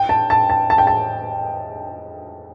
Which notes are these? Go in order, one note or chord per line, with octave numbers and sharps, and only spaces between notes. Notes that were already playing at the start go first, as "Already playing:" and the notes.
Already playing: G5
A5
A5
A5
A5
G5
A5